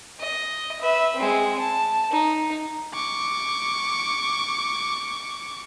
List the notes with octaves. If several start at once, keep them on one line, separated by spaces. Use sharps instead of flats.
D#5
B4 E5
G#3 C4
A5
D#4
C#6 D6